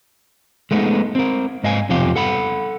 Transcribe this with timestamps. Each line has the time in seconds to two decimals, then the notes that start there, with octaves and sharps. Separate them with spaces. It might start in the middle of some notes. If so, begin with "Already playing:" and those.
0.71 G#3 A3 B3 D#4
1.15 C4 A#4
1.64 G#2 D#5 F5 G#5
1.89 B1 F2 C3 F3 G4 F5
2.16 A4 F#5 B5